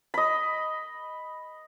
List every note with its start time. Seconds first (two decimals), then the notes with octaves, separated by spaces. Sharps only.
0.14 D#5 B5